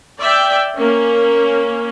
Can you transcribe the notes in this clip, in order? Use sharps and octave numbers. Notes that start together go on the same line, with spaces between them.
D5 E5 G5
A#3 C#4